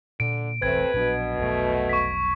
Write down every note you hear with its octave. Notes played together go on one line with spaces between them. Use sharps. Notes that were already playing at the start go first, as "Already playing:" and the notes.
A#2 D3 D7
E1 A1 A3 C4 B4 G#6
A#1 B2 F#3 D4
F1 B1 A3
C#6 B6